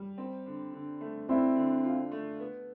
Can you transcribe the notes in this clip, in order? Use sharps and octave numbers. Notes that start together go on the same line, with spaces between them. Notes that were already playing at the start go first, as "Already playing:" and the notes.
Already playing: G3
C4
D3
D3
A3
C4 D4 E4
D3
F4
A3
B3